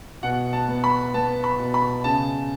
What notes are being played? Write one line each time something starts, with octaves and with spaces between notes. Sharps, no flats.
B2 F#5
A5
B3
B5
B3 A5
B5
B2
B5
C#3 A5